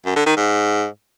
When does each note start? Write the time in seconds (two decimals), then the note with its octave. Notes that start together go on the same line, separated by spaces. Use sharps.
0.06 F#2
0.16 D3
0.26 D#3
0.37 G#2